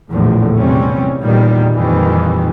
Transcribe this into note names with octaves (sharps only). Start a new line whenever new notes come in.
A#1 E2 A2 D3
E2 C3 G3 C4 C#4
E2 A#2 D#3 G3
F2 A#2 D#3 E3 G3